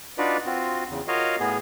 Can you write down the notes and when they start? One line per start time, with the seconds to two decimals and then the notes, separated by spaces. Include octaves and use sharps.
0.18 D4 D#4 F4 F#4 B4 D5
0.46 C4 F4 F#4
0.90 E2 C#3
1.08 F4 F#4 A#4 C#5 D#5 F5
1.40 A2 B3 G#4